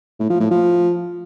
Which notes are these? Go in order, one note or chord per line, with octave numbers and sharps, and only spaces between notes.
A2
F3
A2
F3